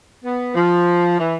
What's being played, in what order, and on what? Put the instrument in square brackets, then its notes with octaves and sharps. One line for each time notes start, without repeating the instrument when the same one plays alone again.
[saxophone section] B3
F3
E3